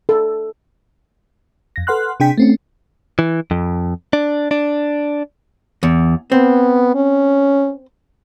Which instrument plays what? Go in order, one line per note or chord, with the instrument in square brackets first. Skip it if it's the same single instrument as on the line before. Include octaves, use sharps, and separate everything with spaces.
[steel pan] A4
[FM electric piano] F2 A#6
A4 B4 F#5 C6 F6 F#6
C3 D4 G#4 G5 B6
A3 C4 C#4
[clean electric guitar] E3
F2
D4
D4
[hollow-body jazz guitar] E2
[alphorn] B3 [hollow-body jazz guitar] C4
[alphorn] C#4